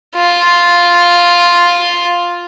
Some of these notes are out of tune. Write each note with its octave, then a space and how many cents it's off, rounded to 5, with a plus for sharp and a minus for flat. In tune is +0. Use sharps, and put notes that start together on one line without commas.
F4 +0